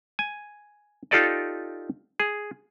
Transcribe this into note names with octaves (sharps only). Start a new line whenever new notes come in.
G#5
D#4 F4 G4 A4 D5 D#5
G#4